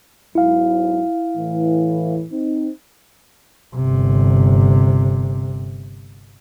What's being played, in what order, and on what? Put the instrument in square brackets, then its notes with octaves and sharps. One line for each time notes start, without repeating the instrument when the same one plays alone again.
[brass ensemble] B1 G#2 F#3 [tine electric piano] E4 F5
[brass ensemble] A2 E3
C4 D#4
[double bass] G1 C3